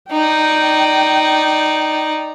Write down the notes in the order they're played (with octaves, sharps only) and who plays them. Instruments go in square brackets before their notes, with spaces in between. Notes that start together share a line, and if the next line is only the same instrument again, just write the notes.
[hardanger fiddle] D#4 D5 [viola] G5